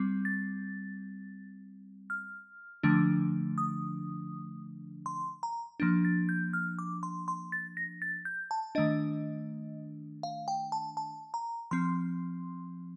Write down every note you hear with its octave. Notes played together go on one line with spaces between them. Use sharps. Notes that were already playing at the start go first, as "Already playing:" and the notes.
Already playing: G3 C4
A6
F6
D3 F3 A3 D4
D#6
C6
A#5
F3 A#3 D4
A6
G6
F6
D6
C6
C6
A6
A#6
A6
G6
A5
D#3 A3 D4 D#5
F5
G5
A5
A5
A#5
F3 C4 C6